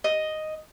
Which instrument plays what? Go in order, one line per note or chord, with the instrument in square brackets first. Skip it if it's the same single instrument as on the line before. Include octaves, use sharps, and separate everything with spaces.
[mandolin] D#5